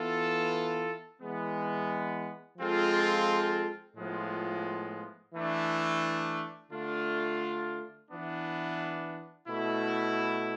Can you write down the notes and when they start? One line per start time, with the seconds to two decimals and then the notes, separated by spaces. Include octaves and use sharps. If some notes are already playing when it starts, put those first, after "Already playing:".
Already playing: E3 B3 F4 A4
1.21 E3 G#3 B3
2.58 F3 G#3 C4 F4 A4
3.96 A2 F3 G#3 B3 F4
5.34 E3 A3 D4
6.72 D3 A3 D4 F4
8.10 E3 B3 D4
9.48 B2 A3 E4